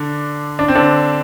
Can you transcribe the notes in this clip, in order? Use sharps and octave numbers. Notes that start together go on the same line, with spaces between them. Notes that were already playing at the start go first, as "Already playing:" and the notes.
Already playing: D3 D4
D4
C4
D3 D4